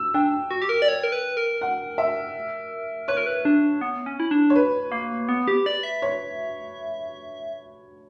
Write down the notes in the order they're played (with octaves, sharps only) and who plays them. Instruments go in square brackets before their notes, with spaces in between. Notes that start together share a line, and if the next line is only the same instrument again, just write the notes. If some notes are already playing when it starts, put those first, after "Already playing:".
Already playing: [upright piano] E6
[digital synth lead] D4 [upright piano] G5
[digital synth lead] F#4
G4
A#4
D5
C#5
A#4
B4
A#4
[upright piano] F#5
E5
[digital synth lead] B4 [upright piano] C#5
[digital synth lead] A#4
B4
D4
B3
C#4
E4
D4
[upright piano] C#5
B4
[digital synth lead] A#3
B3
G4
D5
E5
[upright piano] C#5